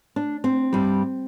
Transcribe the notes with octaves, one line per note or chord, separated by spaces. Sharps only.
D4
C4
G2 G3